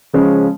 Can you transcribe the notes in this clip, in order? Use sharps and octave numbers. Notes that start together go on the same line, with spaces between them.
C#3 F3 G#3 C#4